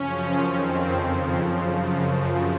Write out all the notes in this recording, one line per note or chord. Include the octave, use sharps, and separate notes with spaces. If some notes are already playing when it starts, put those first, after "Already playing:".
Already playing: F#2 C#3 F3 C#4
F2 D#3 C4
F2 C#3 F3
F#2 C#3 F3